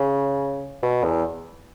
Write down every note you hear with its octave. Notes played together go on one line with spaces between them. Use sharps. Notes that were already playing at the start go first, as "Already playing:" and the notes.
Already playing: C#3
B2
E2